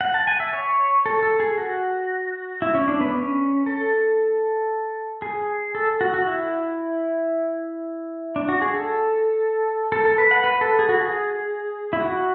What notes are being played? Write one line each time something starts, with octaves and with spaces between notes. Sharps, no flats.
F#5
A5
G#5
E5
C#5
A4
A4
G#4
F#4
E4
C#4
D4
B3
C#4
A4
G#4
A4
F#4
F#4
E4
D4
F#4
G#4
A4
A4
A4
B4
F#5
B4
A4
G#4
F#4
G#4
E4
F#4